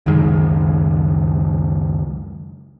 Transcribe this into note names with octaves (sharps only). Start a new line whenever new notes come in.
C#2 F#2 D#3 G#3